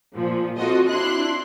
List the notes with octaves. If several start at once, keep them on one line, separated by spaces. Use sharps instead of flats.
A#2 F3
C4 F4 F#4 A4 D#5
D4 E4 C6 F#6